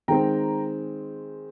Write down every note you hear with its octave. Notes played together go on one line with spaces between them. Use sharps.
D#3 G#3 C4 G5 A#5